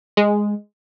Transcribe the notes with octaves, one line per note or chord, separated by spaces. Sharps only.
G#3